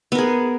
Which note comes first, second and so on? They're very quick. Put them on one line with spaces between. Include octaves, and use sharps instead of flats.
B3 A#4 G#4